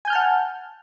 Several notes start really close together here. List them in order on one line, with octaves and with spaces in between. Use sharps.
G#5 G6 F6 A5 F#5